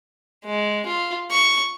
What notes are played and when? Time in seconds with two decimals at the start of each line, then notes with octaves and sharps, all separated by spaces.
0.45 G#3
0.86 F4
1.31 C#6